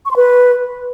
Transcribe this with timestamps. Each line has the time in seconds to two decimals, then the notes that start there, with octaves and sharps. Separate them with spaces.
0.05 C#6
0.11 C6
0.16 B4